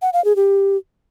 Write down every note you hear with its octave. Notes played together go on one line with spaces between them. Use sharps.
F#5
F5
G#4
G4